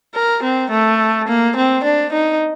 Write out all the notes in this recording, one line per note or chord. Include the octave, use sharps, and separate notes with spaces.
A#4
C4
A3
A#3
C4
D4
D#4